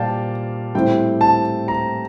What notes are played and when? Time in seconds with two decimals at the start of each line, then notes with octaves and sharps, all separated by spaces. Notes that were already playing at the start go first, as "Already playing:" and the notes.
Already playing: A#2 G3 D5 F5 G5 A5
0.74 A2 G3 C4 G5
1.21 A5
1.68 A#5